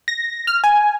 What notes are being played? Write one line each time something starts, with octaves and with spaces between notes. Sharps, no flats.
A#6
F6
G#5